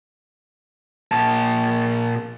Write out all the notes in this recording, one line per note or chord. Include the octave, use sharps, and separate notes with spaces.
A#2 A5